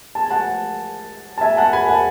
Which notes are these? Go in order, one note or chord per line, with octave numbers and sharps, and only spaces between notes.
A5
G#5
F#5 A5
A5
E5 G#5
F#5 A5
G#5 B5
F#5 A5